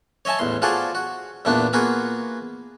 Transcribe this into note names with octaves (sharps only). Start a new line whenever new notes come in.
C#5 D#5 E5 G#5 A5
A1 E2 C6
F3 F4 F#4 G#4 A4 D5
F#4
E2 A#2 A3 B3 D4
A#3 B3 F4 F#4 G#4